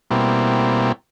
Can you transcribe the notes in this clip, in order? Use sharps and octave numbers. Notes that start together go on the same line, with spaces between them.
B2 G3 A#3 C4 E4